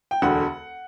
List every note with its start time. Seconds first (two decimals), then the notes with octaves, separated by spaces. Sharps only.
0.11 G5
0.22 E1 D2 D3 F#5